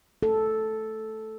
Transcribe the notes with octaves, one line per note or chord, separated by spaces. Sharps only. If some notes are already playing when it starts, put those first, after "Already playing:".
A4